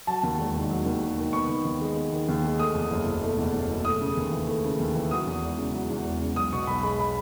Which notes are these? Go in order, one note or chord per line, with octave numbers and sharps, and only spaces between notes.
F#3 A5
D#2
E1
D#3
F#3
D#2
E1
D#3
B3 C#6
D#3
D#2
G#3
B3
D#3
D#2
G#3
A3 D#6
E2
F#1
B2
A3
E2
F#1
B2
A3 D#6
C#3
D#2
E3
A3
C#3
D#2
E3
F#3 D#6
E2
E1
C#3
F#3
E2
E1
C#3
B1 D#6
B2 C#6
B1 B5
G#3 B5
B5